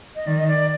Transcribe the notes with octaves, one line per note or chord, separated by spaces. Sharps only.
D#5
D#3 D5
D#5
D5